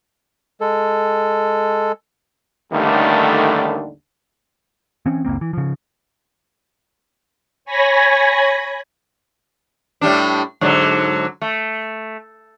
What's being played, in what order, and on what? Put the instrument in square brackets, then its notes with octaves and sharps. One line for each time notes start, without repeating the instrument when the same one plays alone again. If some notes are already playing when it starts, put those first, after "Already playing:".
[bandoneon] G#3 A4
[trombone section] A1 D#2 D3 D#3 G3 A3
[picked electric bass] E3 C4 C#4
F#1 C#2 A#3 C4
E3
C#3 F3
[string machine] C#5 G#5 B5 G#6 A#6
[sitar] A2 G3 D4
G#2 D3 F#3
A3